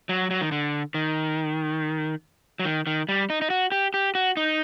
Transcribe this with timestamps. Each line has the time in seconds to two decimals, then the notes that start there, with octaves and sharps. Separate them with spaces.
0.09 F#3
0.30 F#3
0.41 D#3
0.52 D3
0.94 D#3
2.59 F#3
2.65 D#3
2.87 D#3
3.09 G3
3.30 D#4
3.42 D#4
3.50 F#4
3.72 G4
3.94 G4
4.15 F#4
4.37 D#4